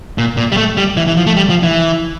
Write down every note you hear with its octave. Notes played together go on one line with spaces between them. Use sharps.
A#2
A#2
G3
A3
G3
E3
E3
F3
A3
G3
F3
E3